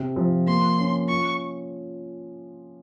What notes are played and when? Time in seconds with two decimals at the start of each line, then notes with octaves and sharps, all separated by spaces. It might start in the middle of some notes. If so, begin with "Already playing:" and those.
Already playing: C3
0.16 F3
0.47 A#3 C6
0.79 C#4
1.09 F4 C#6